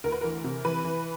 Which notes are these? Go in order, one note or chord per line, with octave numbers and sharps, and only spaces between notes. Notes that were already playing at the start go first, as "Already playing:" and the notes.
D2 A#4
B4
E3 A#4
C3
E3 B4
E3